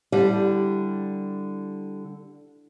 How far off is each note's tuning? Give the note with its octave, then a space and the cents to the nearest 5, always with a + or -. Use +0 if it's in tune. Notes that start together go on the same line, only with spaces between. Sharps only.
D3 +0 G3 -5 E4 +0